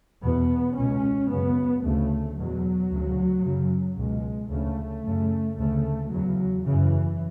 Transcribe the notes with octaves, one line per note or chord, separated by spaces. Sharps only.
E2 B2 B3
C#2 B2 C#4
F#2 C#3 B3
D2 C#3 A3
E2 B2 F#3
D2 C#3
F#2 C#3
C#2 B2 G#3
D2 C#3 A3
F#2 C#3
D2 C#3 A3
E2 C#3 F#3
F#2 C#3 E3